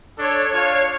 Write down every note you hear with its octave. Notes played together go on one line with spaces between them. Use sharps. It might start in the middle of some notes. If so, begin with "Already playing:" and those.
D4 A4 C#5
D4 F4 C#5 F5